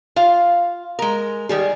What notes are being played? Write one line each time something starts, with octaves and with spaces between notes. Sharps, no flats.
F4 F5
G#3 A#4
D#3 G3 G#4